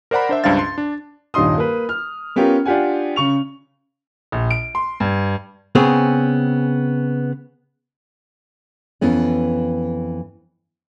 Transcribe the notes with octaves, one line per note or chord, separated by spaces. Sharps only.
A#4 C5 D5 F#5 A#5 B5
D4 C5 E5
C#2 G2 D4 C5 F5 A6
C6
D4
D#1 G2 D#4 C6 D#6
A#3 B4
F6
B3 C#4 F4 G4 A#4
D4 F4 G4 F#5 G#5
C#3 C#6 F7
A#1
D7
C6
G2
C#3 B3 C4 G#4
F2 E3 B3 C#4